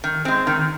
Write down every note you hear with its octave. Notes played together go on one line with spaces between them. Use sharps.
D#3
G#3 C4
D#3